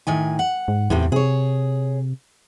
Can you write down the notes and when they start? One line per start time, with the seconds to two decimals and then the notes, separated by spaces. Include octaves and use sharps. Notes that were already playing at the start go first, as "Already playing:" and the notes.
0.07 A2 D#3 G#5
0.39 F#5
0.68 G#2
0.90 E2 A2 C3 E3
1.12 C3 G#4 C#5